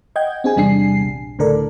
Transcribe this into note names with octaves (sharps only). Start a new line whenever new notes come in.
D#5 F#5 G5 G6 G#6
C4 D4 G#4 G#5
E2 C3 G3 D4 G#5 C7
A#1
C#2 A2 D3 A4 A#4 D5